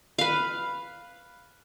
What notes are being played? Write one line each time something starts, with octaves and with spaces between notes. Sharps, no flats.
B4 F5